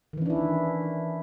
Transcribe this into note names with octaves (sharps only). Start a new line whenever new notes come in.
D#3 E3 C#4 D4 E4